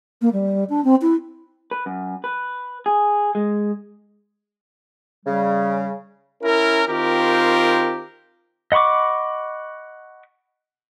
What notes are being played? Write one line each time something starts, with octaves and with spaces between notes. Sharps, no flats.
A#3
G3
D4
C4
E4
B4
F#2
B4
G#4
G#3
C#3 G3
C#4 E4 A#4
D#3 C4 F4 G4 A#4
D#5 F#5 B5 C#6 D6